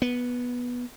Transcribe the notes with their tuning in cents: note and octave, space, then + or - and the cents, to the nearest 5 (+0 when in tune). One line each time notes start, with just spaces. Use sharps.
B3 -10